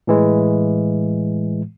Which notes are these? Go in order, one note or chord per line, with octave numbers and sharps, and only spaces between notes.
A2 E3 G#3